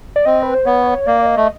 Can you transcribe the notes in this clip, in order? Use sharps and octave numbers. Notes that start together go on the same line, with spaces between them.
D5
C4 D#5
B4
C5
B3 C#5
A#3 D5
D#5
A3